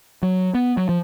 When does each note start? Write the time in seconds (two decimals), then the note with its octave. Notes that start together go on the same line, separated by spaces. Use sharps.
0.23 F#3
0.55 B3
0.77 F#3
0.89 F3